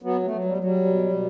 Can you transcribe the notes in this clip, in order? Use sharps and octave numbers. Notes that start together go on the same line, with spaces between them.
F#3 B3
A3
F#3
G3
F#3
G3
B2
B2